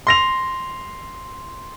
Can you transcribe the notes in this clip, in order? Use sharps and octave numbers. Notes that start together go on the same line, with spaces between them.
C6 A#6 F7